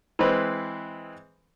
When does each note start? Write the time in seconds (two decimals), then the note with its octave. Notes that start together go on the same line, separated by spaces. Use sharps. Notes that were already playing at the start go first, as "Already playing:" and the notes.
0.19 E3 G#3 C4 B4